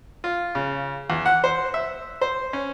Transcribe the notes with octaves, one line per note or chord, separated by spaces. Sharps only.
F4
C#3
E2
F#5
C5
E5
C5
C#4